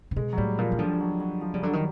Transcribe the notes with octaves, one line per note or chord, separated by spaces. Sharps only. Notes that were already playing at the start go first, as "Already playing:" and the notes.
C3
B2 G#3
F#3
A2 G3
A#2 F3
D#3
D3 F3
G3
F#3
F#3
F3
C#3 G3
D3 F#3
D#3